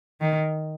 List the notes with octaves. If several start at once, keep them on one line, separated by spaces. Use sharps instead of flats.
D#3